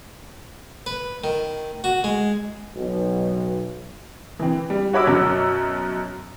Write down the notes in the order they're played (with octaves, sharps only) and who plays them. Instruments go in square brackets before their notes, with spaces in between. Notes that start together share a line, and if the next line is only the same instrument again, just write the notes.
[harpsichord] B4
D#3
F#4
G#3
[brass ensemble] B1 B2
[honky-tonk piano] E3 C4
G3
F#4 C#5 B5 D6 E6
F#2 B2